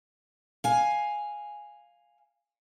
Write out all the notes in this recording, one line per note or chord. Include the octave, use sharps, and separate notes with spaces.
F5 G#5